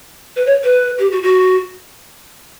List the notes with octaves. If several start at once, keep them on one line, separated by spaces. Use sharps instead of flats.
B4
C#5
B4
G4
F#4
F#4